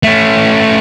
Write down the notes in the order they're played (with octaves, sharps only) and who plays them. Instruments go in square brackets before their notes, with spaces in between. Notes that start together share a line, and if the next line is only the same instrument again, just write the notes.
[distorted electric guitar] A3 C#4